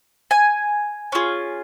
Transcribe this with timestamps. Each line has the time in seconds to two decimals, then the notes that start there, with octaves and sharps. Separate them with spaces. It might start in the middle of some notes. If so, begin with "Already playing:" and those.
0.31 G#5
1.12 C#4 F4 G#4